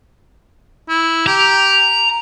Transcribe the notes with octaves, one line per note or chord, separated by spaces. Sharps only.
E4
G4 A#5